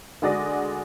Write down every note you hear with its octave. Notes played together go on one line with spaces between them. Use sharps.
D2 G#3 F#4 D5 D#6 A#6